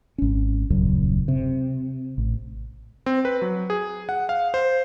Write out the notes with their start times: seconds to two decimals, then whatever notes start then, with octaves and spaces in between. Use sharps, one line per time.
0.18 G#1 C#4
0.70 D#1 C#2 F#2
1.28 C3
2.18 A1
3.06 C4
3.25 B4
3.42 F#3
3.70 G#4
4.09 F#5
4.29 F5
4.54 C5